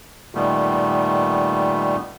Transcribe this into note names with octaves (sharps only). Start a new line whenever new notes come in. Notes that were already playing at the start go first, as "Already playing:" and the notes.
A#2 D#3 G3 A3 B3